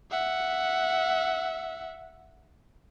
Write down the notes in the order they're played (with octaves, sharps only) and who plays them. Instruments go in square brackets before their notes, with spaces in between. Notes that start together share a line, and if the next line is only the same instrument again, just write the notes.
[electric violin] E5 F#5